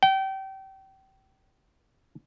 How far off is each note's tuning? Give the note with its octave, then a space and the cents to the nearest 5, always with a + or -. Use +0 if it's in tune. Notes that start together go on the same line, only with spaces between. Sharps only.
G5 -30